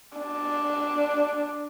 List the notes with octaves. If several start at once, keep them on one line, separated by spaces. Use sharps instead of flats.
D4